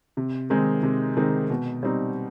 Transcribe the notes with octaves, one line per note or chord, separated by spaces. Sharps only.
C3
D#3 G#3 C4 D#4
C3
D#3 G#3 C4 D#4
B2
G3 C4 D#4